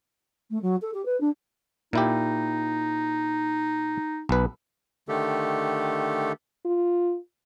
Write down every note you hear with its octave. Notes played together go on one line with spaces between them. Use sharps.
A3
F#3
A4
G4
B4
D4
A#2 D#4 E4 G4
B1 B4
D3 D#3 A3 G4 A4
F4